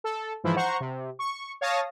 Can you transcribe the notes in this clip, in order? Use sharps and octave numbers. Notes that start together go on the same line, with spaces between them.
A4
G#2 E3 F3 E4
C5 F#5 A#5 C#6
C3
C#6
C#5 F5 A5 D#6 A#6